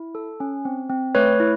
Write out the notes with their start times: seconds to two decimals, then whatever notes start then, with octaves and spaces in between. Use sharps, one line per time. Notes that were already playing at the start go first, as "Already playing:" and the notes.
Already playing: E4
0.15 A4
0.40 C#4
0.65 C4
0.90 C4
1.15 A3 B4 C#5
1.40 E4